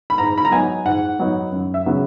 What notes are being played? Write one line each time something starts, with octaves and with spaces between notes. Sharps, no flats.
B5
G#2 A#5
B5
A#5
F#3 B3 D#4 G#5
G#2 F#5
F#3 B3 D#4
F#2
E5
C#3 F#3 B3